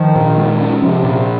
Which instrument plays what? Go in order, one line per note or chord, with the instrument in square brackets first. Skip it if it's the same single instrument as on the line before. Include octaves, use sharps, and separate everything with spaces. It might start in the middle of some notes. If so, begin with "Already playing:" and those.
Already playing: [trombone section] D#3 [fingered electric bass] F3
[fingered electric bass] A#2
G#3
C#4
[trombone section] C3 [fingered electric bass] F3
[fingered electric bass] A#2